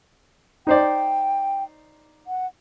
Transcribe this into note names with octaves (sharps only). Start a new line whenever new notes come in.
D#4 C5 D5 G5
F#5